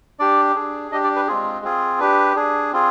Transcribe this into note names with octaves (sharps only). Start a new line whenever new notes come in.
D4 G4 D5
D4 G#4
D4 G4 D#5
D5
B4
G#3 C4 F4 G#4
C4 F4 G#4
D4 G4 B4
D4 G#4
C4 F4 G#4